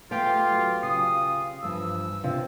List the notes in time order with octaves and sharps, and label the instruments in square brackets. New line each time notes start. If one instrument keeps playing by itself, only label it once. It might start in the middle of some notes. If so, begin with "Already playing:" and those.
[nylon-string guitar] A3 B3 [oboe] F4 [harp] G4 F5 G5
[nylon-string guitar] F#3
[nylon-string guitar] C#3 F4 [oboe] D#6 [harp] C7
[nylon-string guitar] E2 G2 F3 [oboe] E6
[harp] C3 [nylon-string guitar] B3 D4 F4